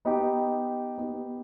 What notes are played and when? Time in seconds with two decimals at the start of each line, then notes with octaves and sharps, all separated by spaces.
0.05 B3 D#4 G4
0.98 B3 D#4 G4